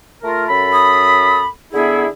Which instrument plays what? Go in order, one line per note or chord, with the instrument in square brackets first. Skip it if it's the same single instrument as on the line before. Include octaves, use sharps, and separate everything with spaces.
[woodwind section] A3 F4 A#4
F#2 A4 B5
[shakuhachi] D#6
[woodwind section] D3 B3 E4 [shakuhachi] G#4